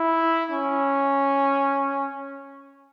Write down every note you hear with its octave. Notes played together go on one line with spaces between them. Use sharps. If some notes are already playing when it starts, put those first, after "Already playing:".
Already playing: E4
C#4